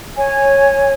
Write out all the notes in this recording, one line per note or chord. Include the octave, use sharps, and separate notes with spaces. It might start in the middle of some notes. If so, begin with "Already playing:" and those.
C#5 G#5